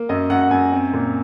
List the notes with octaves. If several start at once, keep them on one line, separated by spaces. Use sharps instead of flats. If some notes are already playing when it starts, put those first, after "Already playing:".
Already playing: A#3
F#2 D#5
F#2 F#5
F#5
F#2 G#5
C4
A#2